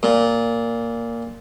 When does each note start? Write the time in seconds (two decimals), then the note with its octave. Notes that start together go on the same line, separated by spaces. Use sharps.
0.03 A#2